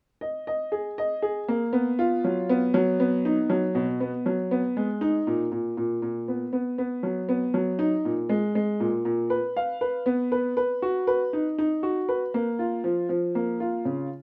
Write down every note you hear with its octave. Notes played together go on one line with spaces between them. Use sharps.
D#5
D#5
G#4
D#5
G#4
A#3
B3
F4
F#3
B3
F#3
B3
D#4
F#3
B2
B3
F#3
B3
G#3
D#4
A#2
A#2
A#2
A#2
B3
B3
B3
F#3
B3
F#3
D#4
A#2
G#3
G#3
A#2
A#2
B4
F5
B4
B3
B4
B4
F#4
B4
D#4
D#4
F#4
B4
A#3
F4
F3
F3
A#3
F4
C#3